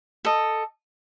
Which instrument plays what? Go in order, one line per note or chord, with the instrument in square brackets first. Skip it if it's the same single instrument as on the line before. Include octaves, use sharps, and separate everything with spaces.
[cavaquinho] A4 D#5